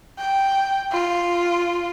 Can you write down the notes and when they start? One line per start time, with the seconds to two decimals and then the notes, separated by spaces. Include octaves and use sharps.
0.19 G5
0.92 F4